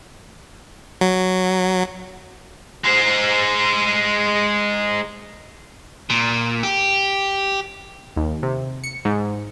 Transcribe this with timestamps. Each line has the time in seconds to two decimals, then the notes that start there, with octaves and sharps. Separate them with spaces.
1.01 F#3
2.84 G#3 C5
6.10 A#2
6.63 G4
8.16 D#2
8.43 C3
8.84 C#7
9.05 G#2